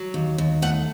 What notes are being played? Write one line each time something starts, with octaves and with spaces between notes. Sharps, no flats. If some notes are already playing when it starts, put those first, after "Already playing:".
Already playing: F#3
D#2
D#2
A3 F#5